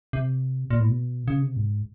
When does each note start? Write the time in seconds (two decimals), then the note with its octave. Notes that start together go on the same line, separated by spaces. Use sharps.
0.13 C3
0.70 A#2
0.80 A2
0.90 B2
1.28 C#3
1.42 C3
1.56 G#2